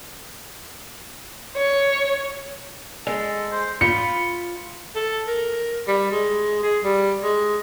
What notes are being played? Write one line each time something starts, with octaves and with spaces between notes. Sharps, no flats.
C#5
G#3 A4
C5
F4 B5 C#7
A4
A#4
G3
G#3
G#4
G3
G#3